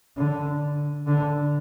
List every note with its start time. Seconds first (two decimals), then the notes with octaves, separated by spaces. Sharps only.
0.17 D3
1.07 D3